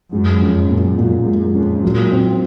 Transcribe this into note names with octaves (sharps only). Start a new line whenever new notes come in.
F#2 G#3
F2 C#4
F#2 A#2
F#2 A#2
F#2 G#3
F2 C#4
A#2 F#3
C4